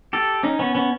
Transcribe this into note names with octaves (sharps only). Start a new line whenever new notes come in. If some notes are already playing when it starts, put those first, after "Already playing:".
G4 A4
C#4 D#4
B3 C#4
B3 C#4